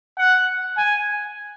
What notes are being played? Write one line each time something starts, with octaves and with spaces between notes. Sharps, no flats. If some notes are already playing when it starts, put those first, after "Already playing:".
F#5
G#5